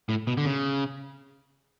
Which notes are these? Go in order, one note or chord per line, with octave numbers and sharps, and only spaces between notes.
A2
B2
D3
C#3